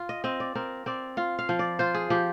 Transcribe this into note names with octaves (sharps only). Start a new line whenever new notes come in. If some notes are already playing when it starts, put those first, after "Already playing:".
Already playing: F4
D#5
C4 D#5
D5
C4 A#4
C4 D5
F4 F5
F5
F3
D5
F4 C5
G#4
F3 G4